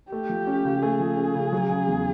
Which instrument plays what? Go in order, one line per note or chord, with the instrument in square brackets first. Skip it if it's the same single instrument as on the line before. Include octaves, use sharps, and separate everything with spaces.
[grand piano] A3 [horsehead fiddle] G4
[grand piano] F3
C#4
C#3
[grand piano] A3 [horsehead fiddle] G#4
[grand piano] F3
C#4
C#3
F#3
C#3
E2